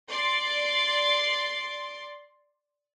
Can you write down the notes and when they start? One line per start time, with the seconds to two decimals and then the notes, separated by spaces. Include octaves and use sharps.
0.10 D5 C6